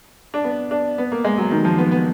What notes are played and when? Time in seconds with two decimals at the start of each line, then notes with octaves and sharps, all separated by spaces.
0.34 D4
0.44 B3
0.71 D4
0.98 B3
1.12 A#3
1.24 G#3
1.38 F#3
1.51 D#3
1.65 F3
1.78 B3
1.91 B3